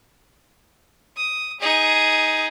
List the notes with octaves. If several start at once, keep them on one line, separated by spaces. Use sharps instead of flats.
D#6
D#4 G#4